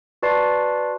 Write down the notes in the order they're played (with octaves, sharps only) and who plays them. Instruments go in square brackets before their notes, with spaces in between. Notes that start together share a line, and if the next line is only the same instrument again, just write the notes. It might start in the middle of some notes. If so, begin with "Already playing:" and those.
[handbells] F#4 B4 D5 A5 C6 C7